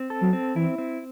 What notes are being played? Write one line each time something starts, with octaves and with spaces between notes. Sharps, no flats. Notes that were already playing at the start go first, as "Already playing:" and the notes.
Already playing: C4
A4
F#3
C4
E3 E4
C4